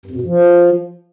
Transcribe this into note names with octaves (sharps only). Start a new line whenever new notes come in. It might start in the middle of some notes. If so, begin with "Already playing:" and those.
G2
F2
B2
G2
F3